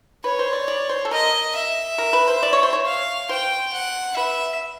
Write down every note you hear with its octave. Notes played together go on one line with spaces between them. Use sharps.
B4 C#5
C5
D5
D5
C5
A4
A#4 D#5
E5
A#4
B4
C5
D5
C#5
C5
C#5
F5
C5 G5
F#5
B4 E5